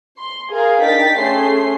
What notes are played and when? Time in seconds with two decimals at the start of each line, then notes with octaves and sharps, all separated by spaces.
0.18 C6
0.50 G#4 A#4 F5
0.82 D4 D#4 G5 A6 B6
1.17 A3 C#4 G#4 C6 C7